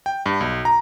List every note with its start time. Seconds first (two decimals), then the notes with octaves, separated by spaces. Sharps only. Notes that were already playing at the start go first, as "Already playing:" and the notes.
0.06 G5
0.26 G2
0.41 B1
0.65 A#5